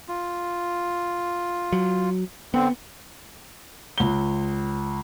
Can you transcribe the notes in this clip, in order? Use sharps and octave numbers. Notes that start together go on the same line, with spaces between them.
F4
F#3
D3 B3 C4
C#2 G7